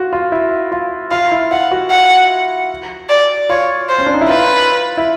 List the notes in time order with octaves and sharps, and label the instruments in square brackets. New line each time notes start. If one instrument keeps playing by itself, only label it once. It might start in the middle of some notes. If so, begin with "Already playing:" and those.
Already playing: [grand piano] F4 F#4
F4
E4
F4
[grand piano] F4 [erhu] F5
[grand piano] E4
[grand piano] F4 [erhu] F#5
[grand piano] F#4
[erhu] F#5
D5
[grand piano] F4 [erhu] C#5
[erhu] C5
[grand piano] C#4
D4
D#4
E4
[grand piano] F4 [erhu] B4
[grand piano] E4